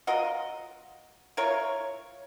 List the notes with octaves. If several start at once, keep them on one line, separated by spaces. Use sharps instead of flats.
F4 F#4 A#4 D#5
E4 F4 A#4 C#5